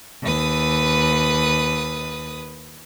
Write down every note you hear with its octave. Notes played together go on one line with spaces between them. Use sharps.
D#2 B4 D#6